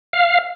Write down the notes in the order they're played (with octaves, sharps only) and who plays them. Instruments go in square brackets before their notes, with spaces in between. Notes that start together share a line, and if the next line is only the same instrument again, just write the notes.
[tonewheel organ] F5